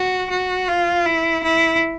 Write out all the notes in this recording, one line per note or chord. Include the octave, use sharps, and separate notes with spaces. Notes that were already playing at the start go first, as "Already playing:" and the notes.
Already playing: F#4
F#4
F4
E4
E4